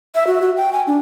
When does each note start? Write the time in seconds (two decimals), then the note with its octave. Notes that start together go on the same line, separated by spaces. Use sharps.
0.15 E5
0.27 F#4
0.41 F#4
0.57 G5
0.73 G#5
0.87 D4